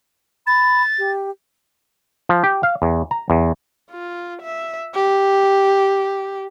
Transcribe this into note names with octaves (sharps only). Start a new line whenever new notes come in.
B5 A6
G4
F3
G4
F5
E2
A#5
E2
F4
E5
G4